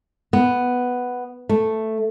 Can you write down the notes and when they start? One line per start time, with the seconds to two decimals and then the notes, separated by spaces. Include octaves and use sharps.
0.33 B3
1.49 A3